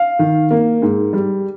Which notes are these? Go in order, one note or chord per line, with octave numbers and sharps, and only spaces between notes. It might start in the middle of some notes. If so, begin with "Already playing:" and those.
Already playing: F5
D#3
A#3
G#2
G3